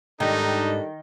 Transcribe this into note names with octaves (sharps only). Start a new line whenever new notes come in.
G#2 D#3 G3 D4 D#4 A4